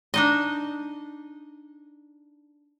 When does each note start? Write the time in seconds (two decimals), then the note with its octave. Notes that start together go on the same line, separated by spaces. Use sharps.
0.14 D4 D#4 D#5